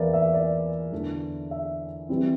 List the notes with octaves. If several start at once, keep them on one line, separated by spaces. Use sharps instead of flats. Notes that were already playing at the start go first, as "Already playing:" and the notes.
Already playing: E2 E3 A#3 E4 D5
E5
D5
E2 D3 A3 E4
E5
E3 G3 C4 E4